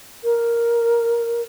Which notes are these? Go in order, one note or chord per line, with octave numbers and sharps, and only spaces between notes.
A#4